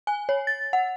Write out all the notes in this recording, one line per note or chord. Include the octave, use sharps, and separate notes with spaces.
G#5
C#5
A6
F#5